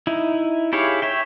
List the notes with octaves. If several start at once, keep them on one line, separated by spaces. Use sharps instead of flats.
D#4 E4
E4 G4 G#4 C#5 F5
C#5 E5 G5